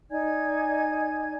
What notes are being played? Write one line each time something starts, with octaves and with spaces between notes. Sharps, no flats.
D#4 D5 G#5 G#6